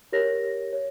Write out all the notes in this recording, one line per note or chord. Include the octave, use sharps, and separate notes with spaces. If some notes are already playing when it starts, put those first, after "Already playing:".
G4 A#4 C#5 A#6
C#5